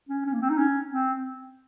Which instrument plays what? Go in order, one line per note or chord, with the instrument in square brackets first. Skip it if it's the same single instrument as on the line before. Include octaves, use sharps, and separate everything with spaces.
[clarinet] C#4
C#4
A#3
C4
D#4
C#4
C4